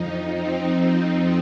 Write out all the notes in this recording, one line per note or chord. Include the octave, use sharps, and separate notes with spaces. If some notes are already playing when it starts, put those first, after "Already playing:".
Already playing: F2 F3 D#4
C4
C4